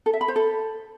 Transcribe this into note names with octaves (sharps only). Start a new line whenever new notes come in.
A4
E5
B5
C5
A4